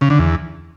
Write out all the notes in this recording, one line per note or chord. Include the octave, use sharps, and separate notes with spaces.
C#3
D3
E2